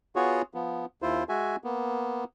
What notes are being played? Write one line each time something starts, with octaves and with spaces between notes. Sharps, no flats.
B3 F4 F#4 G#4 C#5
F3 B3
D#2 E4 F4 C5
G#3 F#4 E5 G#5
A#3 B3